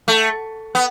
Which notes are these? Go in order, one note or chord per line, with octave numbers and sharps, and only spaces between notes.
A3
B3